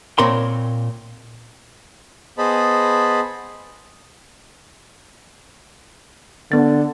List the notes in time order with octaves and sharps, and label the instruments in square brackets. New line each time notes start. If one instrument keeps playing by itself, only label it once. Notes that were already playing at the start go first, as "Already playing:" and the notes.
[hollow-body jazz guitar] A#2 C4 A#4 C#5 D5 C6
[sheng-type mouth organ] B3 G#4 C5 D#5 A5 B5
[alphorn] D3 [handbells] B3 A6